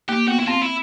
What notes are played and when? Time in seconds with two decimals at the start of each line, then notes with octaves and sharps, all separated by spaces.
0.09 A#3 G4
0.27 B3 F#4
0.39 E4
0.47 C4 F4
0.62 E4